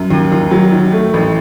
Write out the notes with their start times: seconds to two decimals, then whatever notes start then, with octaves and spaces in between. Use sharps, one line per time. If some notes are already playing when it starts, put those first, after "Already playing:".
Already playing: F#2
0.10 D#2
0.32 D#2
0.51 F#3
0.72 D#3
0.92 A3
1.14 A1